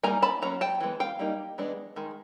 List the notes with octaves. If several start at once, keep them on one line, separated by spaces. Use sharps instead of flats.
G3 A#3 D#4 G#5 A#5
A5 B5
F#3 A#3 C#4 A#5
G5 A5
E3 G#3 B3
F5 G5
G3 A#3 D#4
E3 G#3 B3 D4
D#3 G#3